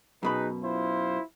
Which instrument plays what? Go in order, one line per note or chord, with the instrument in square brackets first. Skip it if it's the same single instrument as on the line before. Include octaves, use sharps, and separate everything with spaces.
[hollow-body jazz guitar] F#2 B2 B5 [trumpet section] D#4 G#4 B4
[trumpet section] E4 F4 C5